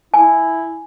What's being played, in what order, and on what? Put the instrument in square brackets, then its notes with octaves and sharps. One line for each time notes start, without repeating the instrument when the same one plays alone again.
[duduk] E4 [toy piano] G#5